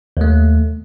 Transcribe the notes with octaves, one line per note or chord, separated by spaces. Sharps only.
D#2 A3